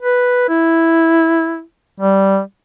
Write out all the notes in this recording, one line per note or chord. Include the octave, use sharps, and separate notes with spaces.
B4
E4
G3